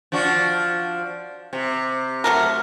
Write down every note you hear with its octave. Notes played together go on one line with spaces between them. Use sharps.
F3 D4 F#4
C3
F#3 A3 A#4